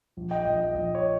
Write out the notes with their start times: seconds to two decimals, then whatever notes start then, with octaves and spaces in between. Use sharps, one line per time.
0.17 A#1
0.31 D#5 G5
0.45 A#1 D#5
0.60 D#5
0.75 A#1 D#5
0.95 C#5